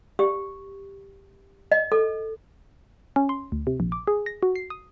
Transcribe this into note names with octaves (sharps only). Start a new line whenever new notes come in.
G4
D#5
A4
C#4
C6
D2
C3
A#1
D6
G#4
A#6
F#4
C7
D#6